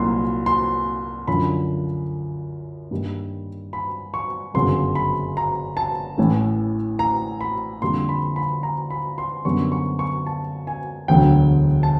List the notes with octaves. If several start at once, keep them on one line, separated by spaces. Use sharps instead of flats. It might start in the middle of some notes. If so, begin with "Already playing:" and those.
Already playing: C2 A#2 F#3 A#3 C6
C6
F#2 D3 F3 B5
G2 D#3 G3 A#3
B5
C#6
G1 F#2 C#3 F#3 C6
B5
A#5
A5
A1 A2 E3 A3
A#5
B5
F2 D3 G3 A#3 C6
B5
B5
A#5
B5
C6
F#2 D3 G3 B3 C#6
C#6
C#6
A5
G#5
E1 D2 D3 F#3 G5
A5